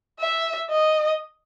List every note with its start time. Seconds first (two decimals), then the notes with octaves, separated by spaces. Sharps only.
0.20 E5
0.70 D#5